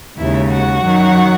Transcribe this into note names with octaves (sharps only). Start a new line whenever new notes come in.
D#2 C#3 G#3 E4 E5
F#4 F#5
F#2 D#3 F#3